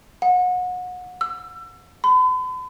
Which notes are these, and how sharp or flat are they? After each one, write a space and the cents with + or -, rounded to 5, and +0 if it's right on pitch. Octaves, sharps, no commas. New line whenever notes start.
F#5 -30
E6 +30
B5 +45